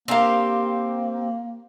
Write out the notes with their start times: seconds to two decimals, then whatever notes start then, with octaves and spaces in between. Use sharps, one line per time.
0.08 A#3 C4 D4 G4 A#4 F5